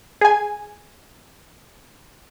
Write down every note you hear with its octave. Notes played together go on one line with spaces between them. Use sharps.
G#4 G#5